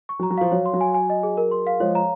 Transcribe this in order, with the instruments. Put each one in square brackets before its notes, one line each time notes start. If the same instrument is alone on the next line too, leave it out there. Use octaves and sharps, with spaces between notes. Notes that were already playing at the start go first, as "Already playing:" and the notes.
[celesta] C#6
[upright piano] F#3
[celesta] A#5
[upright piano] F#3
[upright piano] F3 [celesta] F5
[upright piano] F#3 [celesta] C#5
[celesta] C6
[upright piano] F#3
[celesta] G#5
G#5
D#5
G#4
A#4
C6
F5
[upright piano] F3 G#3 [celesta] C#5
[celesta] A#5